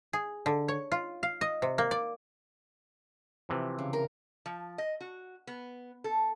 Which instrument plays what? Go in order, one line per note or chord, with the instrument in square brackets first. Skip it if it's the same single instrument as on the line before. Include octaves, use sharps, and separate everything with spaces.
[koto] G#4
D3
C#5
F4
F5
D#5
C3
A#3
D5
[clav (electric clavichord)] C3 E3 F3
[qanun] C#3
A#4
[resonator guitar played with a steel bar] F3
D#5
F#4
B3
A4